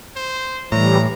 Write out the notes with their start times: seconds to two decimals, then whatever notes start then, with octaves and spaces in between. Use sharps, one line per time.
0.16 C5
0.72 A2 E3 G3 A#5